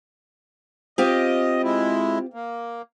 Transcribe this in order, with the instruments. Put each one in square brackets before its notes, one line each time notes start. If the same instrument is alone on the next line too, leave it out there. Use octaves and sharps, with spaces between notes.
[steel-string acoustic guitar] C4 F4 G4 [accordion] D#5
[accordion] G#3 E4
A#3